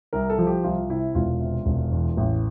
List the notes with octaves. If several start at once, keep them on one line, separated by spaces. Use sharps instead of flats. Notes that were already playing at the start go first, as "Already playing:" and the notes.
C2 A#4
A4
F3
G4
C2 F4
C3 E4
E1 F4
C3
E1
E2
A1